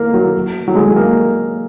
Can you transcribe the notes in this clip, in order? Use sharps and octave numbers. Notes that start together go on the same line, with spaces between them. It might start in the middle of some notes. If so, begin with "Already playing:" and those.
Already playing: A#3
F#3
F#3
G#3
A#3